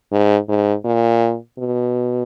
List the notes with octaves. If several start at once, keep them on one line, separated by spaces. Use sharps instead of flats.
G#2
G#2
A#2
B2